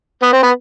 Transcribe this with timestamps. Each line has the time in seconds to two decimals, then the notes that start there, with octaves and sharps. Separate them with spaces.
0.23 B3
0.33 C4
0.43 B3